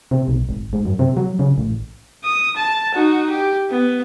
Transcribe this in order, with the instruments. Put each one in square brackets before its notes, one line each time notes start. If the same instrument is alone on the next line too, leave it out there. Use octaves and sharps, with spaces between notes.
[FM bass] C3
B1
G#1
G#2
F#2
C3
F#3
C#3
A1
[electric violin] D#6
A5
D#4 F#4
G4
B3